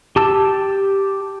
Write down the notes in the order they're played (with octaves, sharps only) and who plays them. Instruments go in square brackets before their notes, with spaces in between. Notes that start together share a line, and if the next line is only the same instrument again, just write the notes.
[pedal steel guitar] G4 A5 E6